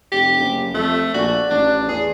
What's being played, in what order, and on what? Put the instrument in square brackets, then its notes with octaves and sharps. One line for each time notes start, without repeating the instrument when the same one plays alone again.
[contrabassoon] F1 [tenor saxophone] G4
[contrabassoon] F#1
[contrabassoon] F2 [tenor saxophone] A3
[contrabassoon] A#1 [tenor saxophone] F#4 [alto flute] D5
[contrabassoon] A1 [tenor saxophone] D4
[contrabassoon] E2 [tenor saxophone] G#4